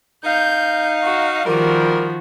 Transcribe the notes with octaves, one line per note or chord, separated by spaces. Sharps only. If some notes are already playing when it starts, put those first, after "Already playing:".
D#4 F5 G6
F#4
D#3 F3 G3 F#4 A#4